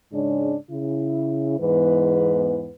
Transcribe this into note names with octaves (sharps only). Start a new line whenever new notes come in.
G#2 C#3 G#3 C#4 D4
C#3 E4
E2 G#2 E3 B3 B4